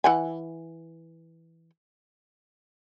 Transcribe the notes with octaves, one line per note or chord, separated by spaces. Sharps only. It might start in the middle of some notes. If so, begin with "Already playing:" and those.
E3 F#5 G#5